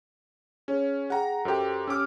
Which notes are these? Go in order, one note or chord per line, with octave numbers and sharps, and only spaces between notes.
C#4 G#4 C#5
G#4 F#5 G5 A#5
F#2 G4 A4 C5 G5
C#4 G4 D6 E6 F6